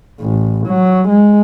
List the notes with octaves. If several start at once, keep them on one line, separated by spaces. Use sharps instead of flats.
A1
F#3
G#3